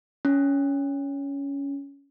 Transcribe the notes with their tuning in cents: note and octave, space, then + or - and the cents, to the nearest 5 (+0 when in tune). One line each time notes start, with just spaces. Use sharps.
C#4 +15